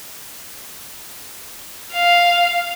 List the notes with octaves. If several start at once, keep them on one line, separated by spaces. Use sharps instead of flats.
F5